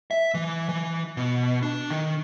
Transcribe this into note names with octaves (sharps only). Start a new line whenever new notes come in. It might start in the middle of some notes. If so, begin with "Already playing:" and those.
E5
E3
E3
B2
D4
D#3